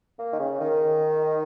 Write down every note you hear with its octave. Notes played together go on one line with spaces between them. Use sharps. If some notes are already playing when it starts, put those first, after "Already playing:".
A#3
D#3
C#3
D#3